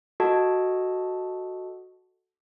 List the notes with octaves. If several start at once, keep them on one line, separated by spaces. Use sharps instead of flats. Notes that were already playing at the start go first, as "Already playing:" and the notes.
F#4 A4 D#5 A5